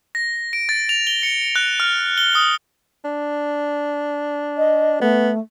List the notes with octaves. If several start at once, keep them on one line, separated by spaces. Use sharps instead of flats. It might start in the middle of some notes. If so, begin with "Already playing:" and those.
A#6
D7
A6
F7
G7
C#7
F#6
F6
G7
D#6
D4
D#5
A3 B3